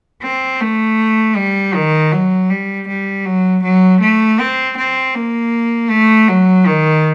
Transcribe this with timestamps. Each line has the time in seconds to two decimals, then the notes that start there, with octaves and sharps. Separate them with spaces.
0.23 C4
0.61 A3
1.37 G3
1.75 D#3
2.12 F#3
2.50 G3
2.88 G3
3.26 F#3
3.64 F#3
4.01 A3
4.40 C4
4.77 C4
5.15 A#3
5.90 A3
6.28 F#3
6.66 D#3